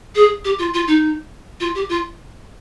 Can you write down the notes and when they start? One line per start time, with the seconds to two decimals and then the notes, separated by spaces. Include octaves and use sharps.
0.15 G#4
0.44 G4
0.59 F4
0.74 F4
0.87 D#4
1.60 F4
1.75 G4
1.89 F4